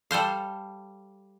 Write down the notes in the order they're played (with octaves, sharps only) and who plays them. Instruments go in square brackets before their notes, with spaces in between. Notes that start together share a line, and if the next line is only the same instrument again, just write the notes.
[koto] G3 A4 C5 F5